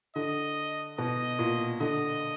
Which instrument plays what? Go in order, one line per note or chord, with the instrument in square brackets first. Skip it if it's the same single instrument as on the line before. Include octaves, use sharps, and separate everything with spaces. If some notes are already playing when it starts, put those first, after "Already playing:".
[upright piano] D3 [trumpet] D#5
[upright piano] B2 [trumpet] D#5
[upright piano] A#2
[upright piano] D3 [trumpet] D#5